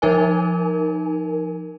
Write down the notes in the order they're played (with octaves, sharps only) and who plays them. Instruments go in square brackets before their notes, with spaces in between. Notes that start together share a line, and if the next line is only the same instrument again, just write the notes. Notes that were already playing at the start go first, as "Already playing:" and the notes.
[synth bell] F3 D#4 A#4 G#5